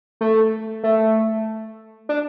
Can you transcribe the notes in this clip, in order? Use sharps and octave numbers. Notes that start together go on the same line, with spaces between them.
A3
A3
D4